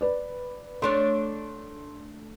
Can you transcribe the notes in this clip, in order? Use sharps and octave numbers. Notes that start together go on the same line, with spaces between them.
B4 D5
A3 D4 C#5 C6